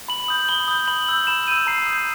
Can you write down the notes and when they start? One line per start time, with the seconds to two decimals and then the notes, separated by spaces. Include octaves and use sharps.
0.08 B5 F#7
0.28 D#6 G6
0.49 B5 G7
0.68 D#6 G6
0.88 B5 F#7
1.09 E6 G6
1.27 B5 E7
1.47 E6 G6 D#7
1.67 A#5 C7
1.86 D#6 G6